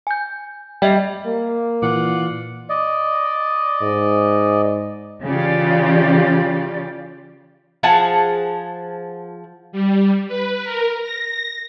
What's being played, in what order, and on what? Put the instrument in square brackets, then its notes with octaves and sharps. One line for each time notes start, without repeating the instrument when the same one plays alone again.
[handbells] G#5 G6
[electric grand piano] G3 [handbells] D#5 E5 G5
[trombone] A#3
[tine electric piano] A#2 E3 [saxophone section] F4 D5 F#5
[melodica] D5 D#5
[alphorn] G#2
[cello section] C#3 E3 F4 G4 D5
[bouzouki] F3 G#4 F#5 A5
[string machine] G3
B4
A#4
A#6